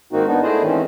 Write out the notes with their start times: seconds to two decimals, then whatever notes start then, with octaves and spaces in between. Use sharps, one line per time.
0.13 G#2 D#3 A#3 C4 D#4 F#4
0.27 B3 D4 D#4 F#4
0.43 A3 E4 G#4 C5 D5 D#5
0.63 G#2 D#3 E3 C4 C#4